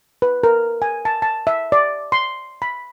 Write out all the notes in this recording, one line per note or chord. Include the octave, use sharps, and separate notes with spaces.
B4
A#4
G#5
A5
A5
E5
D5
C6
B5